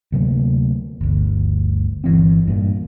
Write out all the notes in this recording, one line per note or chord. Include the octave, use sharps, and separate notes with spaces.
D2 C3 F#3 A#3
G1 D2
G1 E3 C4
G2 A#2